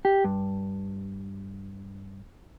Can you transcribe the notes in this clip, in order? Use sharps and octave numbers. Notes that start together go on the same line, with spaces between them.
G4
G2